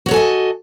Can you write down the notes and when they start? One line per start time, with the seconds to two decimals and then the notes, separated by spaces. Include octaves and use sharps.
0.06 F#4
0.08 C#5
0.11 A4
0.14 G#5
0.16 D#5